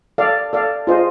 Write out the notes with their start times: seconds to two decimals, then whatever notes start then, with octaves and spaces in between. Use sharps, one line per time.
0.18 A4 D5 F5
0.53 A4 D5 F5
0.87 F4 G#4 C5 D#5